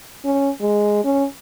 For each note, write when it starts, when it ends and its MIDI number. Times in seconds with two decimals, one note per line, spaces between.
0.25 0.50 61
0.61 1.02 56
1.04 1.25 61